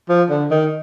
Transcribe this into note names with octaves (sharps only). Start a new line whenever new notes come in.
F3
D3
D#3